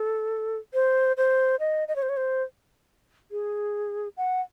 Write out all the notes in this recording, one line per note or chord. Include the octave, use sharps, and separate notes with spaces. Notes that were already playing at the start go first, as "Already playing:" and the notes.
Already playing: A4
C5
C5
D#5
D#5
C#5
C5
C#5
C5
G#4
F#5